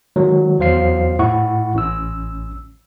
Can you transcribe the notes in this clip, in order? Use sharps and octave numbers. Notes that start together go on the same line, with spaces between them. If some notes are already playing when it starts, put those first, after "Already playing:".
D#3 F#3 G#3
E2 F#3 C5 F5 C7
A2 E4 F#5 C#6
A1 C#4 E6